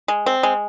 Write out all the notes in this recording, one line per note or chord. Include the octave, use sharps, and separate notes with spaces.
G#3
C4
G#3